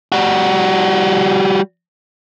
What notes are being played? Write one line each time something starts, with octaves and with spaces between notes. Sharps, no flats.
G3 F#4